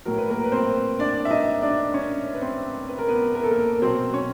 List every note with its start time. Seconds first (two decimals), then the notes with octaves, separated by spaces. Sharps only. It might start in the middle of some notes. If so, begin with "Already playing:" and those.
0.05 A2 F#3 A#4
0.18 B4
0.30 A#3 A#4
0.44 B4
0.52 C4 C5
0.99 D4 D5
1.25 E5
1.30 D#4 D#5
1.62 D4 D5
1.94 C#4 C#5
2.34 B4
2.41 C4 C5
2.88 B4
2.99 A#4
3.08 B3 B4
3.35 A#4
3.43 A4
3.51 A#3 A#4
3.82 B2 F#3 C4 C5
4.13 C#4 C#5